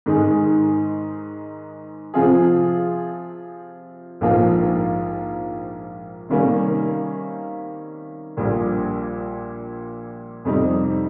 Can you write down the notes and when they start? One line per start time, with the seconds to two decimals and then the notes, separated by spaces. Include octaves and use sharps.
0.06 G#2 D#3 G#3 D#4
2.14 C3 F3 C4 F4 G#4
4.21 A#1 G#2 F3 A#3 F4
6.29 C3 D#3 G3 A#3 C#4
8.37 A#1 A#2 G3
10.45 F2 C3 G3 C4 D#4